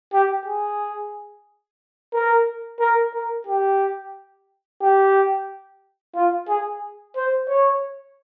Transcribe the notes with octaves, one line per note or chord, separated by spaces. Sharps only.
G4
G#4
A#4
A#4
A#4
G4
G4
F4
G#4
C5
C#5